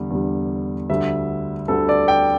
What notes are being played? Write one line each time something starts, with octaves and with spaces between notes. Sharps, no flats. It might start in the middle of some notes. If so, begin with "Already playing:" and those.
Already playing: E2 D3 G3
E2 D3 G3
D2 D3 G3 E5
D2 D3 G3 A4
D5
G5